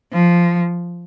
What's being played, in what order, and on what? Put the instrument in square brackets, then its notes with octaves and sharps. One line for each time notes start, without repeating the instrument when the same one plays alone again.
[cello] F3